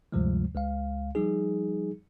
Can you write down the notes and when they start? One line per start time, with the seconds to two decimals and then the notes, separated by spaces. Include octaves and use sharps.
0.12 D2 G2 C3 F3 G3 G#3
0.55 C#2 G#3 F5
1.15 F3 G3 D#4 G#4